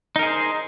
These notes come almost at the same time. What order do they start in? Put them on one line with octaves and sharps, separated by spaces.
D#4 A#4 G#4 C5